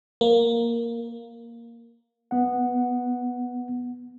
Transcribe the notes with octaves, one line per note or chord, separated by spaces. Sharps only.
A#3
B3 F#5